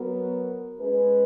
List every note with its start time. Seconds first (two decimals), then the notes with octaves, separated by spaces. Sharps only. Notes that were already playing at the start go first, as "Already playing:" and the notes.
Already playing: F#3 B3 F#4 A#4
0.80 G#3 C#4 G#4 B4